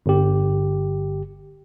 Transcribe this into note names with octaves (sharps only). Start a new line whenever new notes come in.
G1 G4